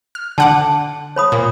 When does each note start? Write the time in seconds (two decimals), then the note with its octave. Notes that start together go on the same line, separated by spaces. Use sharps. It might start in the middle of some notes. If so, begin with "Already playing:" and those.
0.15 F6
0.38 D3 F#5 A5 D6
1.16 C#5 B5 D#6
1.32 A#2